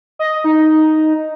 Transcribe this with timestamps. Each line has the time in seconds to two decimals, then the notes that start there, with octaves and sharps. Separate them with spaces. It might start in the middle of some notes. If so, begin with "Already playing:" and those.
0.19 D#5
0.44 D#4